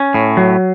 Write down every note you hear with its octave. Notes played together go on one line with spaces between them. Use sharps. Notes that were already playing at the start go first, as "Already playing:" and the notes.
Already playing: C#4
A2
F#3